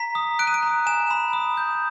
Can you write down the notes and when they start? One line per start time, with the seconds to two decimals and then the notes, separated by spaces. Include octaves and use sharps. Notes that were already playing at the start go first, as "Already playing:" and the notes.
Already playing: A#5 B6
0.15 D#6
0.39 F#6 D7
0.47 D#7
0.54 D7
0.63 A#5
0.86 G#5 E7
1.11 B5
1.33 D#6
1.57 G6